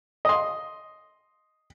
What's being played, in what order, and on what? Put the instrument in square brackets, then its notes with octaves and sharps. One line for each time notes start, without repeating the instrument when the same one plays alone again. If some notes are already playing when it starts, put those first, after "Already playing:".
[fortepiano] D#5 C6